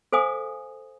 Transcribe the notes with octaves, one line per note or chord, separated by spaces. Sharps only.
A4 C5 F5 G#5 D#6